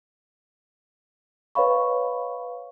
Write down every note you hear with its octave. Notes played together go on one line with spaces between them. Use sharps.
B4 C#5 D#5 F5 B5 C#6